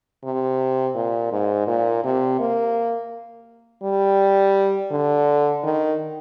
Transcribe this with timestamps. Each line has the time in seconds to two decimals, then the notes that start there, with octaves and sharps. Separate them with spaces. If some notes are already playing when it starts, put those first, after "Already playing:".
0.24 C3
0.95 A#2
1.32 G#2
1.67 A#2
2.04 C3
2.40 A#3
3.83 G3
4.91 D3
5.63 D#3